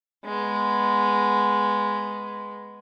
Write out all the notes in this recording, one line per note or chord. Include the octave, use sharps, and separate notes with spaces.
G#3 B3